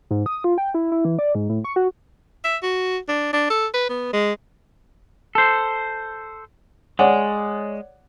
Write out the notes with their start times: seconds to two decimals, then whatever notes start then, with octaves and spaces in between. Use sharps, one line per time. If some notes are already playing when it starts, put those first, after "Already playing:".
0.11 G#2
0.26 D#6
0.44 F4
0.58 G5
0.74 E4
0.92 E4
1.05 E3
1.19 D5
1.35 G#2
1.49 A2
1.64 C#6
1.76 F#4
2.44 E5
2.63 F#4
3.08 D4
3.33 D4
3.50 A4
3.74 B4
3.89 B3
4.13 G#3
5.35 A4 C5
6.99 G#3 C#5 D5 F#5